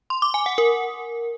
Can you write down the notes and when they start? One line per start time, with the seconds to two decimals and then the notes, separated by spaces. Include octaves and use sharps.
0.10 C6
0.22 D6
0.34 G#5
0.46 F#5
0.58 A#4